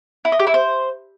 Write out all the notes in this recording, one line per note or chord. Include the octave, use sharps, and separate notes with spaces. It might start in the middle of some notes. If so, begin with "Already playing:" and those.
E4
D#5
G4
E4
C5